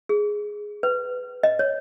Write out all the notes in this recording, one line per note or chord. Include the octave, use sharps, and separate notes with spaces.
G#4
B4
D#5
C#5